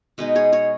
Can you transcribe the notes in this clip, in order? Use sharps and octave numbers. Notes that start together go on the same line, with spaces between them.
B2 G#3 D#4 B4 D#5
G#4 C#5
G#4 C#5